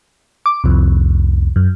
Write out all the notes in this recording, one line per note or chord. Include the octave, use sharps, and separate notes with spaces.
D6
C2 F2
F#2